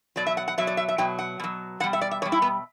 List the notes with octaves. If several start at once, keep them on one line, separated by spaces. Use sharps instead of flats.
B2 F#3 D5
E5
F#5
F#5
B2 F#3 E5
D5
E5
E5
B2 F#3 G5
F#5
B2 F#3
B2 G3 F#5
E5
D5
E5
B2 G3 C#5
E4
B3